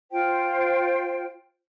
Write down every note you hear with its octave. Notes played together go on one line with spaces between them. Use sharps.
F4 C5 G5